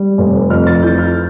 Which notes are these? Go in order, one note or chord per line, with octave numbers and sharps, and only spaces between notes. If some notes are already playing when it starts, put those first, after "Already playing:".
Already playing: G3
F1
F2 F6
A6
E3 G6
F6